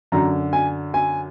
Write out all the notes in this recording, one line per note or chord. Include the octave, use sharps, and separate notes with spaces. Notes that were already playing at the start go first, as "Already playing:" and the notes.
F#2 D3 A#5
G#5
G#5